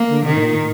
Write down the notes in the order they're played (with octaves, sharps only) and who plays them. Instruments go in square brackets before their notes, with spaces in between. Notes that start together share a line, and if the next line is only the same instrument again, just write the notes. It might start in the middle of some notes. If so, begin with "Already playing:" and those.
Already playing: [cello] A#3
[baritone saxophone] D3
[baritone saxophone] C3 [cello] D#3
[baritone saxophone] A2
A#2
A2